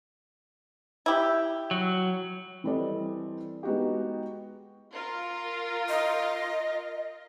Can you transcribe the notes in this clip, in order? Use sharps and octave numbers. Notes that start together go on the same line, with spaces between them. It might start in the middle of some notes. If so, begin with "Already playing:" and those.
E4 G4
F#3
E3 G3 C4 A4 D5 D#5
G#3 B3 D#4 F#4 G4
F4 A#4
D#5